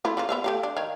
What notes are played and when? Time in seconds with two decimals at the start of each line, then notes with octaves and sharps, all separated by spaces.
0.05 A3 E4 F4
0.17 C#3 A#3 F4
0.29 B3 E5 F5
0.44 A3 G4 F5
0.63 D4
0.77 D#3 C#5 F5